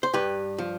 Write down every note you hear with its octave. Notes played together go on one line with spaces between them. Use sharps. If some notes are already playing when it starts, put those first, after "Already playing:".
C5
G2 G4 B4
F3